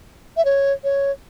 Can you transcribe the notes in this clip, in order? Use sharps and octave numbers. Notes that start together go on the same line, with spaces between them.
E5
C#5
C#5